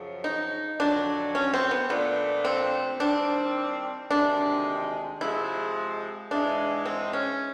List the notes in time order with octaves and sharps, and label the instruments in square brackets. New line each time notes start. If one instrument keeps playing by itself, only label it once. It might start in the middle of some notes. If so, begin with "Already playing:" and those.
Already playing: [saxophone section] F#2 C#3 F3
[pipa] D#4
[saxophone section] F2 D3 F#3 [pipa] D4
[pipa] C#4
C4
B3
[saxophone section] A#2 F3 A3 D4 [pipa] B3
[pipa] C4
[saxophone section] D#3 G3 C4 [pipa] D4
[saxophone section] D2 C3 D#3 G#3 [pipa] D4
[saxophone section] C3 F3 G#3 [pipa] E4
[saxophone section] G#2 E3 G#3 [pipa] D4
[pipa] C4
C#4